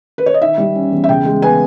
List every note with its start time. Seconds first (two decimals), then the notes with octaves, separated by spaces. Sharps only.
0.18 B4
0.26 C#5
0.34 D#5
0.42 D#3 E5
0.58 G3
0.75 C#4
0.92 E2
1.04 E5
1.08 C#3 G5
1.25 G#3
1.42 B3 G#5